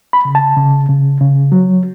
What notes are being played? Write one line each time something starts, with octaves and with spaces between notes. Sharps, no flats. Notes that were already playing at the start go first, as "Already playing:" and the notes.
B5
C#3
A5
C#3
C#3
C#3
F#3